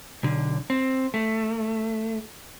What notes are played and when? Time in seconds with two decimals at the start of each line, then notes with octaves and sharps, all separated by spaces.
0.23 B1 D3
0.70 C4
1.14 A3